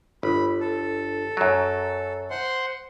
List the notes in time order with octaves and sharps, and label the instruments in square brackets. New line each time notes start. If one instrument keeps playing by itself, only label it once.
[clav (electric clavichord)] G1 [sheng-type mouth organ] B5
[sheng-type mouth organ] A4
[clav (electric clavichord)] F#2 F#3
[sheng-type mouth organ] C5 F#5 C6